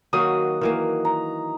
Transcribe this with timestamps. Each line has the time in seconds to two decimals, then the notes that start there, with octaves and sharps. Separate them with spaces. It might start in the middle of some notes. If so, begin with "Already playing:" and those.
0.13 D#3 F#3 A#3 F#4 D#6
0.61 D#3 E3 A#3
1.05 A#5